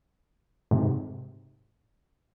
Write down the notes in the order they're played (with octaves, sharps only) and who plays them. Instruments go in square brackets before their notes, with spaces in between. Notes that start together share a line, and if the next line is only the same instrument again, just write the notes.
[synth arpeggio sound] G#2 C3